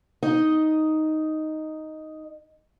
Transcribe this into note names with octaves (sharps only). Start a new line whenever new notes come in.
D#4 D#5